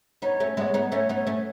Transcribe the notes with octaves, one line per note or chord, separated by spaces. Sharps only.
B3 D#4 C#5
A3 C#4
G#3 B3 C#5 E5
B3 D#4
A3 C#4 C#5
B3 D#4
C#5
A3 C#4